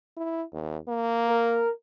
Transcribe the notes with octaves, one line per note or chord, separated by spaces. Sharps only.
E4
D#2
A#3
A#4